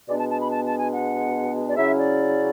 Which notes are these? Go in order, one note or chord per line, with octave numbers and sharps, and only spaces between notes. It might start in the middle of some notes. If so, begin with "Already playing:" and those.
B2 G#3 B3 D4 D5
A5
A5
B5
A5
A5
G#5
F#5
D5
C#3 F#3 C#4 E4 E5
D5